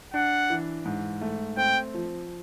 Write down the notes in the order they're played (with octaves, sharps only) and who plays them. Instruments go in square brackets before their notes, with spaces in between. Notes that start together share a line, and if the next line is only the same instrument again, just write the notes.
[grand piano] D4 [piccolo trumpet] F#5
[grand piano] E3
G#2
A3
[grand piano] C4 [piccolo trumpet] G5
[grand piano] F3